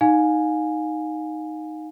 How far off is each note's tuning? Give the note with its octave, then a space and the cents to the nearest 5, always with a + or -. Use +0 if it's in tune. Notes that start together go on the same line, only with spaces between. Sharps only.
D#4 +0 F5 +30 G#5 +0